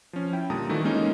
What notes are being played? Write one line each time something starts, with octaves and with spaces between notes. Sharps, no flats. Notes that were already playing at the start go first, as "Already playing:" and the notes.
F3 C#4
E4 G5
A#2 D3 G3 A5 A#5 D#6
D#3 E3 A3 D4 E4 F#4
G#3 A#3 C#4 D#4 F4